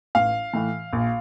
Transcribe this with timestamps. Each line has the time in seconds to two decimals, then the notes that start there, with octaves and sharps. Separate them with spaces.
0.15 A1 F5
0.54 A2 E3
0.93 A#1